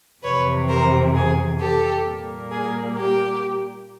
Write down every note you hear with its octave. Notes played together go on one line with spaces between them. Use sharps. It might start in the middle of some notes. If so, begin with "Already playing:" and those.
F2 C3 E3 B4 C#5
A#4 C5
G#4
G4 A4
A#2 G3 A#3
G#4
G4